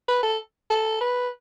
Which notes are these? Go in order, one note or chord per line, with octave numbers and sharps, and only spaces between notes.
B4
A4
A4
B4